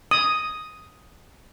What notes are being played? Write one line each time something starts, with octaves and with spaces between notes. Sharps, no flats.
D#6